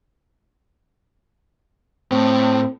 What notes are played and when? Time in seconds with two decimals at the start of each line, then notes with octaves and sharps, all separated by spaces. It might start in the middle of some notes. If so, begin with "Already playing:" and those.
2.12 A2 C4